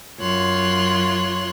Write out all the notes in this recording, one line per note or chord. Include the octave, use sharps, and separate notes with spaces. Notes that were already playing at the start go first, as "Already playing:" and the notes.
F#2 F4 C#5 C6 F#6